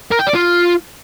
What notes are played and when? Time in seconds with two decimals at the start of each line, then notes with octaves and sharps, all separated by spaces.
0.11 A#4
0.19 G5
0.27 D5
0.34 F4